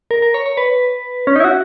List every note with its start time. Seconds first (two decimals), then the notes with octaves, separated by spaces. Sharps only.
0.11 A#4
0.22 A#4
0.34 C#5
0.46 C#5
0.57 B4
1.27 C#4
1.36 D#4
1.40 E4
1.44 F#4